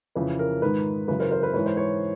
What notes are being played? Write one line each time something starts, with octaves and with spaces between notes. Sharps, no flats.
F2 C#3 E3 B4
A#4
G#2 D#3 B4
F#2 C#3 E3 B4
A#4 C5
A#4 C5
B4
G#2 E3 B4 C#5
C5
B4 C#5